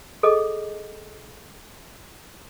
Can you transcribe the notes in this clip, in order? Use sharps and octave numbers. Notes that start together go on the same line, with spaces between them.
G#4 A4 D#5 D6